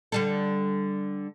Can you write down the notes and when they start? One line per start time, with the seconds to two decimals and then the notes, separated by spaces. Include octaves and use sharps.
0.12 D3 G3 A4